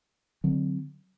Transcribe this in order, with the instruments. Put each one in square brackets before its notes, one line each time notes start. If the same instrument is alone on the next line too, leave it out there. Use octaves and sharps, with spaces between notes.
[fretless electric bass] D3 F#3 C4